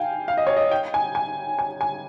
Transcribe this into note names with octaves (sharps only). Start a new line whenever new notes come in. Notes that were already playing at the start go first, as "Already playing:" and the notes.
Already playing: F5 G5 G#5
F5
D#5
C#5
D#5
G5
G#5
G#5
G#5
G#5